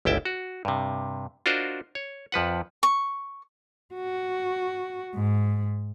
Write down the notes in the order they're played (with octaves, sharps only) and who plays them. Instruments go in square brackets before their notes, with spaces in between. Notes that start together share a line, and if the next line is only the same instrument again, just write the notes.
[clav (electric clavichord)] G1 C#2 E4 G5 A5
F#4
G2 C3
D4 F4 F#4 A#4 C5 D#5
C#5
F2 F3 B4 F#5
[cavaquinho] C#6
[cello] F#4
G#2